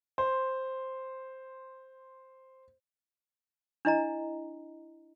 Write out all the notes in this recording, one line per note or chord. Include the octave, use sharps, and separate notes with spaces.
C5 C6
D4 E4 D#5 A#5